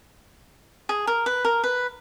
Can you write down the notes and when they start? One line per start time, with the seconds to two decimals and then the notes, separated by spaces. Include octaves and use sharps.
0.89 G#4
1.07 A#4
1.26 B4
1.45 A#4
1.64 B4